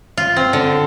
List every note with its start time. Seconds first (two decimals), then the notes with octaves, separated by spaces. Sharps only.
0.17 F4
0.36 C4
0.53 D3